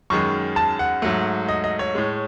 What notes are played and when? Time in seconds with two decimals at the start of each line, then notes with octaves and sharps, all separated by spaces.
0.10 F#2 D#3 G#3 C#6
0.56 A5
0.79 F#5
1.02 G#2 F#3 A3
1.49 D#5
1.64 D#5
1.79 C#5
1.95 A2 G#3